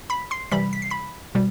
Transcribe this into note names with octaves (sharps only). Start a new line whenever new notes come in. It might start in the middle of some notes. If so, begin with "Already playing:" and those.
B5 B6
C6 C7
C3 E3 G3 B5 B6
B6
C7
B5 B6
B2 G3